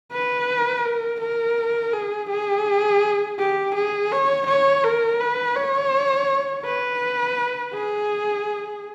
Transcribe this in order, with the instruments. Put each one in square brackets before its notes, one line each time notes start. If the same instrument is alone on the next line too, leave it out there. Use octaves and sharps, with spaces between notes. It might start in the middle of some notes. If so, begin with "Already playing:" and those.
[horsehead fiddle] B4
A#4
A#4
G#4
G#4
G4
G#4
C#5
C#5
A#4
B4
C#5
B4
G#4